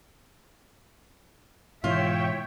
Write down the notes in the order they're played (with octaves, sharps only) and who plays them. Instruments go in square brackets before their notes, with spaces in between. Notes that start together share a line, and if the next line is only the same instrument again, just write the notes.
[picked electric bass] G#2 B2 E3 [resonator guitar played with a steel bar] F4 [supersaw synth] C#5 G5 [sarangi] E5